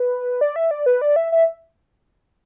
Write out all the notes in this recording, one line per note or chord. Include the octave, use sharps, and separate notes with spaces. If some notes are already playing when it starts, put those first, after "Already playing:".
Already playing: B4
D5
E5
D5
B4
D5
E5
E5